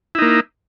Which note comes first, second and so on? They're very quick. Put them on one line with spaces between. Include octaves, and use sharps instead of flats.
E4 D#4 A#3